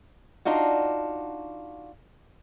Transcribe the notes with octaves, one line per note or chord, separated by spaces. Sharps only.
D4 D#4 F4 F#4